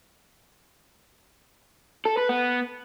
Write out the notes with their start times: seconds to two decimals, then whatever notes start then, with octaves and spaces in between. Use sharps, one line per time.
2.05 A4
2.17 B4
2.29 B3